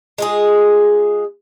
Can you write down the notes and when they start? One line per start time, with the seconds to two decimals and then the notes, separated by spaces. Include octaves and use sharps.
0.18 G#3 F4 G#4